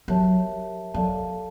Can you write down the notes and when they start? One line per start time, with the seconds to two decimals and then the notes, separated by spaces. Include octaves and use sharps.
0.08 F#3 G4 A#4 C#5 E5 A5
0.94 F#3 A4 D5 F5 A5